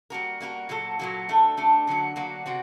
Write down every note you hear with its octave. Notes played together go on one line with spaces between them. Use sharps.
G3 A#3 F#4 A#4
G3 A#3 F#4 A#4
A#2 F#3 A#3 F#4 A4
A#2 F#3 A#3 F#4 A4
A3 D4 A4
A3 D4 A4
D3 F#3 A#3 F#4
D3 F#3 A#3 F#4
C3 C4 F#4